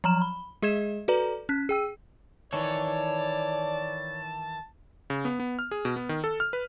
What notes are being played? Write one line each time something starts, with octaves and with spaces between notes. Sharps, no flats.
F3 F#3 A#5 F6 E7
B5
G#3 G#4 D#5 G#6 E7
F#4 A4 B4 D5 A#5
C#4 F#6 B6
G#4 G5 E6
D#3 E3 C#5 D5 A5
C#3
B3
B3
F6
G#4
B2
B3
D#3
A4
F6
B4